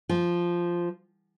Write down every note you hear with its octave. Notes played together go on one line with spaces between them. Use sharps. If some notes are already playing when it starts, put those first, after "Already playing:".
F3